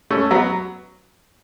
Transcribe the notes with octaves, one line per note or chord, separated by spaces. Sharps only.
A3 C#4
F#3 B3